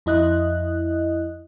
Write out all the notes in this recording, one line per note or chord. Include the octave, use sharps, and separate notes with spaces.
F2 E4 D#5 F#6